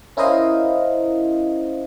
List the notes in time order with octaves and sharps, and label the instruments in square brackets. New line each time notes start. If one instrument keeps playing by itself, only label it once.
[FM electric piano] C#4 E4 A#4 C5 D#5 F5